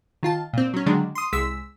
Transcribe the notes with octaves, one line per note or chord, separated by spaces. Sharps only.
D#3 F4 A5
A#2 C4
F#3 C#4
D3 D#3 F#3 G#3 D4
C6 D#6
C2 G#3 E6 B6